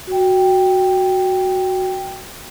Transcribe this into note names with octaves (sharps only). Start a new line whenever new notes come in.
F#4 G5